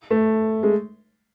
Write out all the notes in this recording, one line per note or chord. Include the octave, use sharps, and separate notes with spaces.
A3
G#3